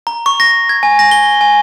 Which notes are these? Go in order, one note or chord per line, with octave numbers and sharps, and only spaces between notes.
A#5
C#6
A#6
G#6
G#5
A#6
G7
G#5